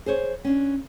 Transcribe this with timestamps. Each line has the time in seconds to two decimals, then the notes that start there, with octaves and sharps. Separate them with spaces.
0.06 G#4 C5 C#5
0.44 C#4 D4